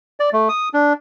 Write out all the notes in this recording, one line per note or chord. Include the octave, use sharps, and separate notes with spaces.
D5
A3
D#6
D4